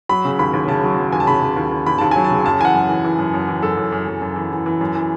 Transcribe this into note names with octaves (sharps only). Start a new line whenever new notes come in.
F#3 B5
C#3
D#2 B5
D#2
C#3 A5
F#3
F#3
D#2 G#5
A5
C#3 B5
C#3
D#2
D#2
D#2 B5
D#2 A5
F#3 G#5
A5
C#3
F#2 A5
E3 F#5 G#5
F#2
E3
E3
F#2
F#2
E3
F#2 A4
F#2
F#2
F#2
F#2
E3
E3
E3
F#2
E3